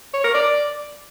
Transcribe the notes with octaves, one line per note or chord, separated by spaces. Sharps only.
C#5
A#4
D5